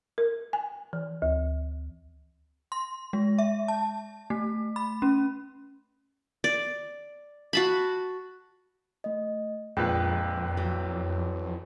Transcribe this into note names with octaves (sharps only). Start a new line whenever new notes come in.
A#4
G#5
E3
D2
C6
G#3
E5
A5
A3
B5
C#4
D5
F#4 A5 B5
A3 D#5
A#1 F2 A#2 G#3 B4 G5
E3 F#3